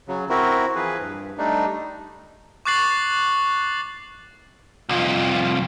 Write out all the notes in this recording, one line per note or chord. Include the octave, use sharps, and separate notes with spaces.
C#3 F#3
C4 E4 F#4 A#4
E3 F3 G#4 B4
G2
G3 A3 D4 D#4
C#6 D6 F#6 A6 C7 F#7
C2 F2 F4